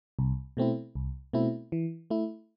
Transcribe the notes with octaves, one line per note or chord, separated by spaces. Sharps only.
C2
B2 A3 C4 E4
C2
B2 A3 C4 E4
E3
A3 E4